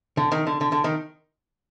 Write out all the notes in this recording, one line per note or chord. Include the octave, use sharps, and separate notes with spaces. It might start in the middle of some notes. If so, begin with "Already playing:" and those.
D3
D#3
D3
D3
D3
D#3